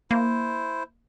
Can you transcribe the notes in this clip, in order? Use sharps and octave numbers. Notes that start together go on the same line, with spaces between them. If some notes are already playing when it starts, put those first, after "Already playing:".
A#3 E4 C5